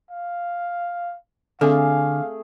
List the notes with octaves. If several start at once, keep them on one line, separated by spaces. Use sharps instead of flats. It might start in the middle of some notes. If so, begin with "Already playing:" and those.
F5
D3 A3 C4 G#4 A4 F5